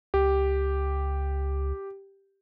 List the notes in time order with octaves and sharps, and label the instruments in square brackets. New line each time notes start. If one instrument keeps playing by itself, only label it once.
[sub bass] C#2 [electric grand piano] G4